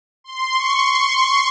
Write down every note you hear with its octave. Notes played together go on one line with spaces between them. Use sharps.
C6
C#6
C6
C6